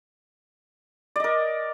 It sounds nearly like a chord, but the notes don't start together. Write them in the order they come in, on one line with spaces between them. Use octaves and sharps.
D5 D#5 A#4